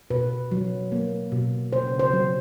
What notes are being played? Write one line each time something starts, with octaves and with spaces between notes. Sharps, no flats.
B2 B4
F#3
A#3
B2
C#3 C5
C5
F#3